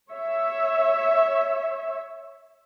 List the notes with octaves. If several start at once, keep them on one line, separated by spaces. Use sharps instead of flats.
C#5 E5